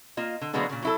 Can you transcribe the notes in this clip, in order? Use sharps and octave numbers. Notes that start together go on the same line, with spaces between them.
A#3 F4 D#5
D3
D3 F#3 G#3 A#3 B3 D4
A#2 C#3
F#3 E4 A4